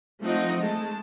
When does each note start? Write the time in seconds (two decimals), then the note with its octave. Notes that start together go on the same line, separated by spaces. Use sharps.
0.23 F3 A3 C4 D#4 D#5 F#5
0.60 G#3 A3 A5